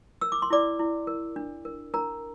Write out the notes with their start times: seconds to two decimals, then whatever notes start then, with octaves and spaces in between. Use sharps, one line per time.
0.21 A#4 E6
0.32 D6
0.42 C6
0.50 E4 D5 D6
0.79 E4
1.07 A#4
1.36 D4
1.65 A#4
1.94 D4 A#4 A#5